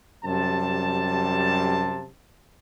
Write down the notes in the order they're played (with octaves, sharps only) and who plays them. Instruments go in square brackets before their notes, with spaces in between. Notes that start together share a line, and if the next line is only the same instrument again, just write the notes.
[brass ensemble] F#2 C3 G3 A5